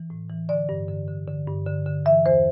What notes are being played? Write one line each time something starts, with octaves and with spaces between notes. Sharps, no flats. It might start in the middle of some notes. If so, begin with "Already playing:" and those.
Already playing: E3
A2
E3
D3 D5
G2
D3
D3
D3
G2
D3
D3
E3 E5
E2 C5